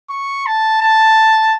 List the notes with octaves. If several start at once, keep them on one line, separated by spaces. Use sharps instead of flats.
C#6
A5
A5